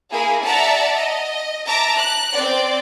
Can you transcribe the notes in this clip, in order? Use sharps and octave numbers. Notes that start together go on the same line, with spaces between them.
A#3 E4 G#4
D5 E5 F#5 A5 A#5
D#5
E5 A5 A#5 D6
F#6
C4 D5